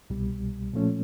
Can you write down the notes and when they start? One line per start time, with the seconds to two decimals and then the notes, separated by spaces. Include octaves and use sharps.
0.10 C2 B2 G3
0.73 A#2 F3 A3 C#4